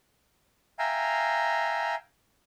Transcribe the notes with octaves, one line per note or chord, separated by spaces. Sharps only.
E5 F5 G5 G#5 A#5